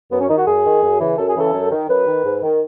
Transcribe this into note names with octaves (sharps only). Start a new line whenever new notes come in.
F#2 B3
C#4
D#3 D#4
F#4
F#2 G#4
D#3
F#2
C#3 E3
F#2 A4
G#4
C#3 E3 A4
F#2
D#3
F#2 B4
D#3
G#2
D#3